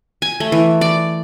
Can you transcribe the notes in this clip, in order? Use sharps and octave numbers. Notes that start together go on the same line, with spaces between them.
G#5
A3
E3
D5